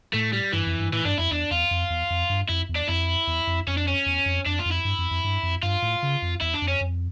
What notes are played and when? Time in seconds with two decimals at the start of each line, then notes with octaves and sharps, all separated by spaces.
0.13 A2 A3
0.33 G3
0.52 G2 E3
0.66 F2
0.79 G2
0.93 A2 E3
1.05 G2 D4
1.18 F2 E4
1.31 E2 D4
1.51 E2 F4
1.71 F2
1.90 E2
2.10 F2
2.29 G2
2.49 F2 E4
2.69 E2
2.76 D4
2.88 F2 E4
3.27 E2
3.47 F2
3.67 F2 C#4
3.77 D4
3.87 C#4
4.06 E2
4.26 F2
4.46 F2 D4
4.59 F4
4.65 F2
4.71 E4
4.85 G2
4.98 F2
5.11 F2
5.24 G2
5.43 F2
5.63 G2 F4
5.82 A2
6.02 C#3
6.22 F2
6.41 E2 E4
6.54 D4
6.62 F2
6.68 C#4
6.80 F2